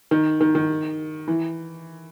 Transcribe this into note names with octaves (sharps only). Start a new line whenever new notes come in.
D#3
D#3
D#3
E3